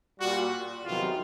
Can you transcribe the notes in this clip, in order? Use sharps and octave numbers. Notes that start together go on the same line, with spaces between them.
A#2 G3 F#4
E2 C3 D#3 F#3 F4